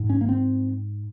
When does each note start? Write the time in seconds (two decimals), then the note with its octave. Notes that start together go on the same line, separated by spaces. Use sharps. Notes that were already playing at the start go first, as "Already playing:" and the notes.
Already playing: G#2
0.10 C#4
0.21 A#3
0.29 C4